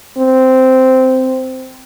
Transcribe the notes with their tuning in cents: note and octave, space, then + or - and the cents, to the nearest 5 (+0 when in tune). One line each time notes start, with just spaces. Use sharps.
C4 -10